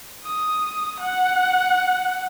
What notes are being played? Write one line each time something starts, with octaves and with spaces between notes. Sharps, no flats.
D#6
F#5